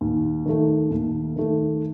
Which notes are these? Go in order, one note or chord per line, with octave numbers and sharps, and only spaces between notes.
D#2
D#3 A3
D#2
D#3 A3